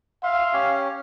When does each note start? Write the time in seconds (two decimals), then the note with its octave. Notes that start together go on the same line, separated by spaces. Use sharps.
0.23 E5 F5 C6
0.53 C#4 G4 C#5